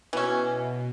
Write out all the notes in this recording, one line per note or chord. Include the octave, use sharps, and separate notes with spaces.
B2 E3 C#4